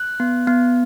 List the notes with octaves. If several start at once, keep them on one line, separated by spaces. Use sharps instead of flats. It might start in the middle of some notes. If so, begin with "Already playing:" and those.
Already playing: F#6
B3
B3